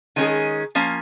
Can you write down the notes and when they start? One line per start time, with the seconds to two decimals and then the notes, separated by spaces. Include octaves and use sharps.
0.16 D#3 G#3 C#4 G#4
0.75 F3 A#3 C#4